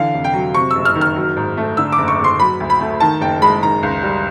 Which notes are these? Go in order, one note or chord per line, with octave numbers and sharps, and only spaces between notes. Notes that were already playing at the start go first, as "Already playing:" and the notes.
Already playing: D3 E3 F5
F1
G5
F#3
C3 C#6
F#1 E6
F6
D#3
F6
F#3
G#2
A3
D3 E6
D6
F#1
C#6
F#1
C6
F#3 B5
D2
B5
A3
D#3 A5
F#1 G5
G#3 B5
D#3 A#5
C#2
G3